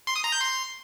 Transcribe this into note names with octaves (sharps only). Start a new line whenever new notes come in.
C6
D#6
A#5
G6
C6